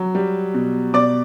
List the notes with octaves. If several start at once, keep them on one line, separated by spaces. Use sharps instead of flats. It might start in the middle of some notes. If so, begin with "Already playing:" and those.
Already playing: F#3
G3
B2
B2 D5 D6